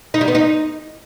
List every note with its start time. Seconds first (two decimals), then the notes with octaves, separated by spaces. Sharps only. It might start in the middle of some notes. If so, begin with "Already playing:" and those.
0.14 D#4
0.21 G3
0.28 B3
0.35 D#4